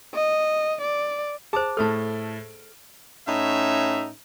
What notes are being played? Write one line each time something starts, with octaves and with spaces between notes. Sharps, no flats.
D#5
D5
G#4 C5 A5 D6
A2 A3 A4 A5 F6
A2 C#4 D#4 E5